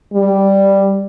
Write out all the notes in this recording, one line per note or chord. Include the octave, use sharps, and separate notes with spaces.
G3